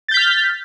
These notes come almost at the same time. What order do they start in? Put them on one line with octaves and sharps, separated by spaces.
A6 G6 B6 F6